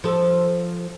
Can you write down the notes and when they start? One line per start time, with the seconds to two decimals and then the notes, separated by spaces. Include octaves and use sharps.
0.04 F3 A4